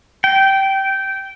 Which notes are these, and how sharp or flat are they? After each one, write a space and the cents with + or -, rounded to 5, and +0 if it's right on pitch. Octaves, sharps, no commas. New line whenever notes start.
G5 -15